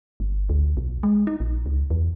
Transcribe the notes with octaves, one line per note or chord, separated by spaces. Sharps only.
G1
D2
B1
G#3
D#4
A#1
C#2
E2